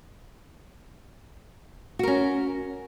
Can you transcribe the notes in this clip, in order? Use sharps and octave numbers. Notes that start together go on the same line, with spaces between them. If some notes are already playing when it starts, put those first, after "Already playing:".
C#4 F#4 A#4